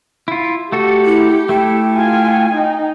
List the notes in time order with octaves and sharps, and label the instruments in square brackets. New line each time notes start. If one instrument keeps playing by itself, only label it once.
[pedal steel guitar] E4 F4
[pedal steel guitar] A3 F#4 A4 [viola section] G4
[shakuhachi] E4
[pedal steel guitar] A3 E4 A4 [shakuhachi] G5
[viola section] F4 G#5
D#4